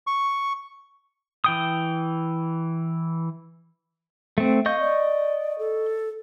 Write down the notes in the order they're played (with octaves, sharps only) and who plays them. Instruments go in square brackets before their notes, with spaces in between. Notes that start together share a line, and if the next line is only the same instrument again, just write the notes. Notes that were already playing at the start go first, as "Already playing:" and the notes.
[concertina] C#6
[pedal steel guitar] E3 G5 D#6
A3 C4
[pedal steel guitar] D#5 C#6 G6 [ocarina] F5
[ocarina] D5
A4